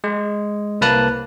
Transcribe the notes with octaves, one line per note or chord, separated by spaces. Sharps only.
G#3
C2 A#3 B4 A5 F#6